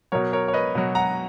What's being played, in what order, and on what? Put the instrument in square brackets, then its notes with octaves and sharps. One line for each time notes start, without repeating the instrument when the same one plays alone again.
[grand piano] B2 F#3 A#4 C#5
A#4 C#5
C#5
B4 D#5
B2 F#3
F#5 A#5